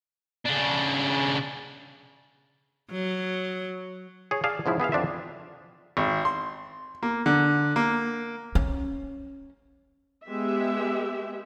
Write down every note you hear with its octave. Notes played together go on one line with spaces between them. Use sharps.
C#3 D4
F#3
G#4 C#5
G#4 D5 F5 A5
G#2 C#3 F3 E4
B3 G#4 E5 F5
F2 D4 C5 E5
G#1
C6
A#3
D3
A#3
C#4
G#3 B3 G4 E5